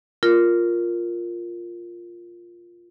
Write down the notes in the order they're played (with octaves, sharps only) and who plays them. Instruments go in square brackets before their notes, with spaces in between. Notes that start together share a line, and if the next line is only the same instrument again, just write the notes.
[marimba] F4 A#4